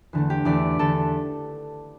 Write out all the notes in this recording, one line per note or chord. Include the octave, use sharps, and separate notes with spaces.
E2 D3 A3
G4
E2 D3 A3 D5
E2 D3 A3 A4